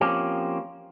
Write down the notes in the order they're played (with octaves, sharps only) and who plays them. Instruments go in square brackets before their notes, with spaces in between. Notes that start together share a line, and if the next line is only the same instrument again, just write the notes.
[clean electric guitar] F3 A#3 C4 C#4 G4